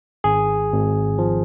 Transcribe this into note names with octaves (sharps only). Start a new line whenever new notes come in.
G#1 G#4
G#1
F3